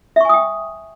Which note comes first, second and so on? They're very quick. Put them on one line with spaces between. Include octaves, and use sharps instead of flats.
E5 C#6 G#5 D#6 G5